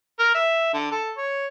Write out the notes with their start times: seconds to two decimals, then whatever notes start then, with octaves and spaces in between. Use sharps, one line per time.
0.19 A#4
0.35 E5
0.74 D3
0.91 A4
1.17 C#5